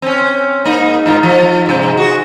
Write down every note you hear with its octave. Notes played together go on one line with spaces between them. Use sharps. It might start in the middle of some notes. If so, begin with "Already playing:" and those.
C4 C#4
G#2 A#3 D#4
G#2 D#4 F4
F3
G#2 C3
F#4 G#4